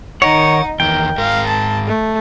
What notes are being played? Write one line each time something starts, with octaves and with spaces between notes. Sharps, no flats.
D#3 D#4 A#4 C#5 F#5
E2 D#3 A#4 G5
G#2 A#4 F5
A5
A3